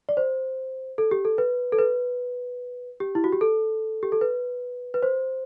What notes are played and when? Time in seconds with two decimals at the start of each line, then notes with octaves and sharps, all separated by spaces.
0.09 D5
0.17 C5
0.98 A4
1.11 G4
1.25 A4
1.38 B4
1.72 A4
1.79 B4
3.00 G4
3.15 E4
3.24 F#4
3.32 G4
3.41 A4
4.03 G4
4.12 A4
4.21 B4
4.94 B4
5.03 C5